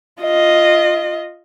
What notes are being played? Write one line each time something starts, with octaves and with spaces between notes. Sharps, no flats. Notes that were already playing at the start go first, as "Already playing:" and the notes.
F4 D#5